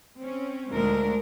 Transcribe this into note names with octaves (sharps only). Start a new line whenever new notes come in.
C4 C#4
D2 A#2 G#3 D4 A#4